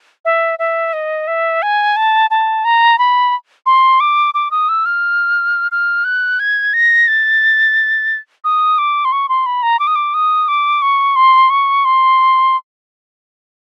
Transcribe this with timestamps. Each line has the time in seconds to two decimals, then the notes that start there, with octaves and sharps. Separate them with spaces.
0.25 E5
0.59 E5
0.93 D#5
1.27 E5
1.62 G#5
1.96 A5
2.30 A5
2.65 A#5
2.98 B5
3.66 C6
4.00 D6
4.34 D6
4.51 D#6
4.69 E6
4.86 F6
5.72 F6
6.04 F#6
6.40 G#6
6.73 A#6
7.08 A6
8.44 D#6
8.78 D6
9.05 C6
9.12 C#6
9.29 C6
9.46 B5
9.63 A#5
9.79 D6
9.87 D#6
9.95 D6
10.14 D#6
10.48 D6
10.82 C#6
11.16 C6
11.50 C#6
11.85 C6